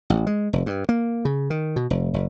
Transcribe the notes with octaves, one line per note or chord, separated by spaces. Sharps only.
A1
G#3
F1
G2
A#3
C#3
D#3
B2
F1
F#1